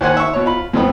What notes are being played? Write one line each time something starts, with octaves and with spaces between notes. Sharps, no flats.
D#2 C5 F#5 G#5
E5 C#6
B2 C#5
F4 B5
F2 A2 B3